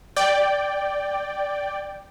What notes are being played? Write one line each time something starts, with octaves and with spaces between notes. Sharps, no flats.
D5 G5